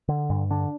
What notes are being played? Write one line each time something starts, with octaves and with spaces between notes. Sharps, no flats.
D3
G2
D3 D4